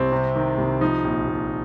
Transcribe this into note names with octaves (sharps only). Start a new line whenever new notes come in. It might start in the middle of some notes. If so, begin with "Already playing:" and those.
Already playing: C2 C4
C3
D#3
C2
F3 D#4
A#1
A#1